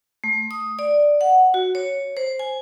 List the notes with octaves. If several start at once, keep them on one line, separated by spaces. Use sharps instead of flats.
A3
D#6
D5
F#5
F#4
C#5
C5
G#5